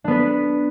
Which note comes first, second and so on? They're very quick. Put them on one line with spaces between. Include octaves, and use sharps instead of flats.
D4 B3 B4